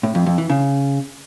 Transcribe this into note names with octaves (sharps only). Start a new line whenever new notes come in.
A2
F2
F2
E3
C#3